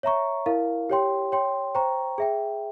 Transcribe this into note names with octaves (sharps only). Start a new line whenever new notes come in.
C#5 E5 A#5 C#6
E4 A#4 F5
G4 C#5 G5 C6
C#5 G5 C6
C5 G5 A#5 C#6
G#4 E5 G5